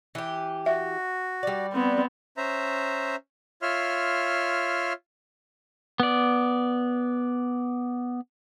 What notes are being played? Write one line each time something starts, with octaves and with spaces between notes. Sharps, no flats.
E3 G4
F#4 E5
G3 D5
B3 C4
C#4 C5 E5 A#5
F4 C#5 E5 C6 F6
B3 D5